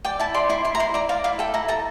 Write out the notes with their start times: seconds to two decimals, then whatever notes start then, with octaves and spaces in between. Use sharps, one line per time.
0.05 D5 G5
0.20 E4 A5
0.34 D5 C6
0.49 E4 C6
0.65 E4 C6
0.75 A#5
0.80 E4 C6
0.94 D5 A#5
1.09 D5 F5
1.24 E4 F5
1.39 A4 G5
1.54 E4 A#5
1.68 A4 A#5